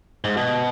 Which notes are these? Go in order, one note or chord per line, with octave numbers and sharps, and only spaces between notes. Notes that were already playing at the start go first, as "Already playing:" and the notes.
G#2
B2